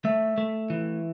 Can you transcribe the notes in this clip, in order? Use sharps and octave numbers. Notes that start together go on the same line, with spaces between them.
A3 E5
A3
E3